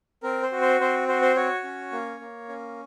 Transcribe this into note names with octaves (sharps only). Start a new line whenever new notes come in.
C4 A#4
C5
F#4
C5
C4 C5
F#4 C5
C5
F#4 C#5
C#4
A#3
A#3
C#4